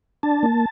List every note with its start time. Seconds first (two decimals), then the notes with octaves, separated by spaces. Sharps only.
0.23 D4 A5
0.43 A#3